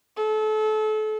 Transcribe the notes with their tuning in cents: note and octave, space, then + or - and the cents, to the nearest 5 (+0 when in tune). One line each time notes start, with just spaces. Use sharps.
A4 -30